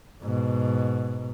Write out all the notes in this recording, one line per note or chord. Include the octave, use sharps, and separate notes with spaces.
G#2 B2